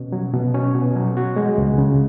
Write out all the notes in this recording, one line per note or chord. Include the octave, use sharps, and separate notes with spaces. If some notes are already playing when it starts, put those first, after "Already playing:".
Already playing: B2 C#4
F#3
B2
C#4
B2
F#3
F#4
G#3
C#2
C#3